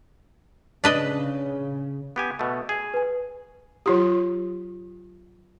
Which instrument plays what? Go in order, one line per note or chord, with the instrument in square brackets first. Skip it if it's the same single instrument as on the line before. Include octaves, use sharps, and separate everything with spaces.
[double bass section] C#3 [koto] D4 B4 D#5
[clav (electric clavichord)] B3 G4 G#5
B2 A3
G#4
[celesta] B4 G#5
[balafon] F#3 F4 G4